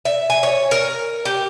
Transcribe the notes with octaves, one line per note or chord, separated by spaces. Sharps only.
E5
G#5
C#5
A#4
G4